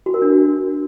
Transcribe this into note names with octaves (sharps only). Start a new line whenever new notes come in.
F#4
A#4
D4